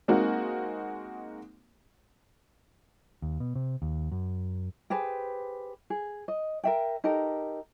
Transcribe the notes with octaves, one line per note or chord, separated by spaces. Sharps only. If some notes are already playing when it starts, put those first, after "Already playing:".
G#3 A#3 C4 D#4 F#4
D#2
B2
C3
D#2
F#2
G4 G#4 B4 C5
G#4
D#5
A#4 E5 G5
D#4 G4 A4 A#4